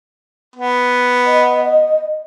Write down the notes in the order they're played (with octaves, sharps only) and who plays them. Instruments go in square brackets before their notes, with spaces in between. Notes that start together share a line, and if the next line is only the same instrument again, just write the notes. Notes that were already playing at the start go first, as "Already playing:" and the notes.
[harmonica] B3
[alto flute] D#5